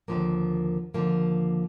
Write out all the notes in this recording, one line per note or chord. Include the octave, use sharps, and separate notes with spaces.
D#2 D3 F3 A#3
D#2 D3 F3 A#3